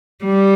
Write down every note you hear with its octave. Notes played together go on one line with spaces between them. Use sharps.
G3